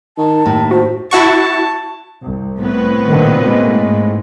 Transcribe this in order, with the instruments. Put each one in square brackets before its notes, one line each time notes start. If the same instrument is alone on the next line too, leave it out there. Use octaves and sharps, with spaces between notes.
[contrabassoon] D#3 [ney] A5
[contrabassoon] D#2 [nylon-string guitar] A2
[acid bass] F#4 [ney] C5
[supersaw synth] E4 F#4 C#6 [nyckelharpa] A5
[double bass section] C2
[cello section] A2 [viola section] B3 C4 B4
[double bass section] A#2 D3 [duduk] D#3
[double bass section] B2 A#3 [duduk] G#3
[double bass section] G#2